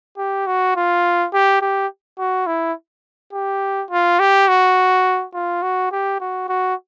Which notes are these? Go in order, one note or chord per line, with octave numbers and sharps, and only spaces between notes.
G4
F#4
F4
G4
G4
F#4
E4
G4
F4
G4
F#4
F4
F#4
G4
F#4
F#4